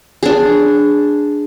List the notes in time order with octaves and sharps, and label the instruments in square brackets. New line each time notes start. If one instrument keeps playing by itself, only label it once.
[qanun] D4 G#4